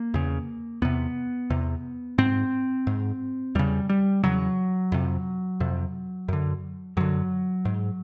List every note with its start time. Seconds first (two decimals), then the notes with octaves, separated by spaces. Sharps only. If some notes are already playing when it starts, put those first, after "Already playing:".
Already playing: A#3
0.14 E2 C#3
0.82 E2 C3 B3
1.50 E2 C3
2.18 G#2 C4
2.87 G#2
3.55 E2 C#3 G3
3.89 G3
4.24 E2 C#3 F#3
4.92 F2 C3
5.60 F2 C3
6.28 F#2 D3
6.97 F#2 D3 F#3
7.65 G#2